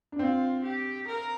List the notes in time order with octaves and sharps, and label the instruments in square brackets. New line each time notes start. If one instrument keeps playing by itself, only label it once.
[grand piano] D4
[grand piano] C4 [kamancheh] F4
[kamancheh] G4
A#4